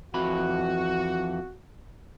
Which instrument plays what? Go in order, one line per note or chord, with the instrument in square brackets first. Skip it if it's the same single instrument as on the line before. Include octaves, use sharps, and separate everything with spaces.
[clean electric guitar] F2 E3 B5 [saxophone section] F#4